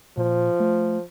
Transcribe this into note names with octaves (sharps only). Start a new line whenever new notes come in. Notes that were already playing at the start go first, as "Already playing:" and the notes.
A#2 F3
A3